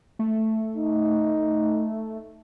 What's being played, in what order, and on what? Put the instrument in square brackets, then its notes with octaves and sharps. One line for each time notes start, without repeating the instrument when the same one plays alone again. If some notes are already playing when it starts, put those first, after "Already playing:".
[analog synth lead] A3
[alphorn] D#4